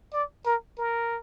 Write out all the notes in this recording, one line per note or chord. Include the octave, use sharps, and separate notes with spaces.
D5
A#4
A#4